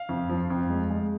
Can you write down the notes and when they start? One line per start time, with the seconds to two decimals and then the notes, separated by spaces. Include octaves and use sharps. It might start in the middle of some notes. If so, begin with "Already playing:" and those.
Already playing: F5
0.09 F2
0.30 F3
0.50 F2
0.70 G#3
0.90 G#3